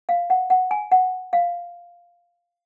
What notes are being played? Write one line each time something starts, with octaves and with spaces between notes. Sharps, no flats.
F5
F#5
F#5
G#5
F#5
F5